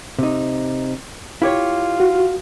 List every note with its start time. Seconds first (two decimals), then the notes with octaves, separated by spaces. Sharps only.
0.19 C3 D#4
1.42 E4 F4 G4 C#5
2.00 F#4